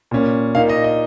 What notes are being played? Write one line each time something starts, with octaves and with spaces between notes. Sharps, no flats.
A#2 A#3 C#4
A#2 A#3 D#4 F5
D#5
D#5